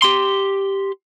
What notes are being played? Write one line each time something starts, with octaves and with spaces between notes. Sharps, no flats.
G4 C6